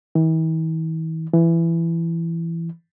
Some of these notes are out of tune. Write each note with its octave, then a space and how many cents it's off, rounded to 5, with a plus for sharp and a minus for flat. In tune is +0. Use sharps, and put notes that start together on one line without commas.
E3 -45
E3 +15